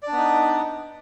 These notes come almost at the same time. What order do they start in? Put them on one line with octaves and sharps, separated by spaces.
D5 D4 B3 D#4